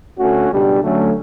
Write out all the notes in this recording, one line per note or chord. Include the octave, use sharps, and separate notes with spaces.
D2 D3 A3 C#4 F#4
C#2 B2 G3 D4
D3 F#3 A3 C#4